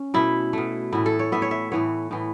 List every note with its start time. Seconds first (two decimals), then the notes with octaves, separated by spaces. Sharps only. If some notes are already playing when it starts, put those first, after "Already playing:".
Already playing: C#4
0.14 B2 A3 E4
0.53 B2 A3
0.92 A2 E3 B3 E4
1.06 A4
1.19 C#5
1.32 A2 E3 B3 E5
1.42 C#5
1.51 E5
1.72 A2 E3 B3 C#5
2.11 A2 E3 B3